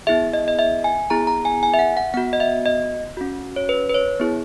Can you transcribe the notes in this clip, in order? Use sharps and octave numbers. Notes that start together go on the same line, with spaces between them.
B3 E4 G#4 E5
D#5
D#5
E5
G#5
B3 E4 G#4 A#5
A#5
G#5
G#5
E5
F#5
F#5
B3 F#4 F#5
D#5
E5
D#5
C#4 F#4
C#5
B4
B4
C#5
B3 E4 G#4